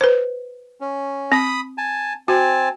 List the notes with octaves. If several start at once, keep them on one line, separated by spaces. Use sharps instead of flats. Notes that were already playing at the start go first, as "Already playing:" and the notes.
B4 C5
C#4
C4 B5 D#6
G#5 A5
C4 F#4 G#5 A5